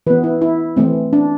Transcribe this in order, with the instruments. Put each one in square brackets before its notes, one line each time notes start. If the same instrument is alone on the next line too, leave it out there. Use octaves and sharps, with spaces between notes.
[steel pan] E3 B3 B4
E4
E4
E3 A3 C4
D4